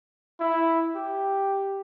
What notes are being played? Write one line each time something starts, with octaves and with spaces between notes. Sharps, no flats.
E4
G4